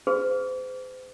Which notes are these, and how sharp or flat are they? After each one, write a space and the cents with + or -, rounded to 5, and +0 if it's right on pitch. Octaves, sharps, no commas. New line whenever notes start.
G#4 -5 C5 -40